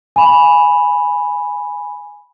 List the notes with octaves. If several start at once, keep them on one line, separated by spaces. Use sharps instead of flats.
G#5 B5